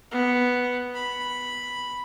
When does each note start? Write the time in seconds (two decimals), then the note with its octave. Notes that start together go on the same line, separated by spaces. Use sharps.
0.12 B3
0.95 B5